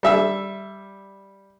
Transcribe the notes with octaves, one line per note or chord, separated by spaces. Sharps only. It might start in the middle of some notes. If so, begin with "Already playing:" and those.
G3 E5 E6